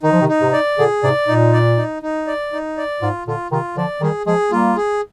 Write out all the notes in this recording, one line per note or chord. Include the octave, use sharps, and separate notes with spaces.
D#3 D#4
F3
C3 D#3
D#4
G#2 C3
D5
A#2 D3 G#4
G#2 C3 D5
A#2 D#4
D5
D#4
D#4
D5
D#4
D5
G#2 F4
A#2 D3 F4
C3 D#3 F4
D3 F3 D5
D#3 G3 G#4
F3 G#3 G#4
G3 A#3 F4
G#4